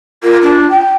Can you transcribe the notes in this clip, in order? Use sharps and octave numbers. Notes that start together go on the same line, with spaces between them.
F4 A#4
D4
G5